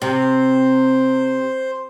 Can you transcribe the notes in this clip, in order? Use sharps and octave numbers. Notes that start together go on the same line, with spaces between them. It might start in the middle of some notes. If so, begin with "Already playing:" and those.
C3 C5